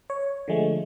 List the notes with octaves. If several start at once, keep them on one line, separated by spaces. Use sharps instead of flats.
C#5
D3 F3 G#3 A3